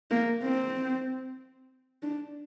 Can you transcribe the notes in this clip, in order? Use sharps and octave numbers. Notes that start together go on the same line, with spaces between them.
A#3
C4
D4